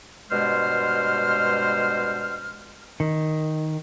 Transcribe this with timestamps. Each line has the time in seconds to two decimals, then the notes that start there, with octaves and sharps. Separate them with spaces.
0.30 G2 B2 G#3 C5 F6
3.00 D#3